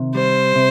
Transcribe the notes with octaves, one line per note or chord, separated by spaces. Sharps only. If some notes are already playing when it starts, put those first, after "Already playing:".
Already playing: C3 D#3
G3 C5
C3